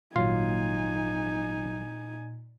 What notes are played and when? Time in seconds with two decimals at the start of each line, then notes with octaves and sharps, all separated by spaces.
0.16 G#1 A#2 F#3 D#4 F4 G#5 C7